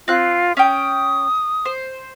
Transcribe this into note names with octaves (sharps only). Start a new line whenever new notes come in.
C4 F4 F#6
C#4 G5 D#6
C5